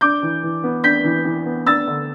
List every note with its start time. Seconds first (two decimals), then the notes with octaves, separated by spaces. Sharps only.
0.01 D4 D6 G6
0.23 E3
0.43 E3
0.64 B3
0.84 D4 G6 B6
1.04 E3
1.25 E3
1.46 B3
1.66 D4 E6 A6
1.87 D3